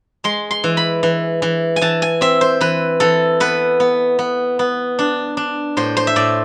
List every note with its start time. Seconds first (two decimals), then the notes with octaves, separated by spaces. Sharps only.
0.24 G#3 C6
0.51 C6
0.64 E3
0.77 B5
1.03 E3
1.42 E3
1.76 G#5
1.81 E3 A5
2.02 G#5
2.21 C4 E5
2.41 C5
2.60 E3 B4
3.00 E3 A4
3.40 B3 B4
3.80 B3
4.19 B3
4.59 B3
4.99 D4
5.37 D4
5.77 A2 C5
5.97 C5
6.07 E5
6.16 A2 D5